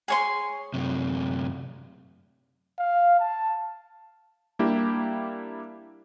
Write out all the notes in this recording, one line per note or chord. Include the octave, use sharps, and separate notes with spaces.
G#4 C#5 C6
F#2 C3
F5
A5
G3 A#3 D4 E4 G4